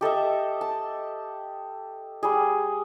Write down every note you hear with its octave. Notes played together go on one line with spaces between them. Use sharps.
G4 A4 D#5 E5
A5
G3 G#4